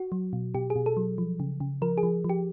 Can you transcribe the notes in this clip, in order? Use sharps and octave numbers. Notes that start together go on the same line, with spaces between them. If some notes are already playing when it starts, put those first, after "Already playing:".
Already playing: F#4
F#3
B2
B2 G4
G#4
B2
A4
F#3
F3
C#3
C#3
F3 A#4
G#4
F3
F3
G4